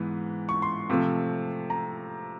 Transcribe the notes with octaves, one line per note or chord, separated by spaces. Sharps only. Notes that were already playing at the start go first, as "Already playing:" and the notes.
Already playing: G#2 E3 B3
C#6
C6
C3 F3 A3
A#5